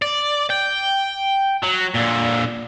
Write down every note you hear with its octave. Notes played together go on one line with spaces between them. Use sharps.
D5
G5
F#3
A#2 D3